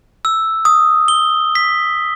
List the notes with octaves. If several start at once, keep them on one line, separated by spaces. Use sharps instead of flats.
E6
D#6
G7
B6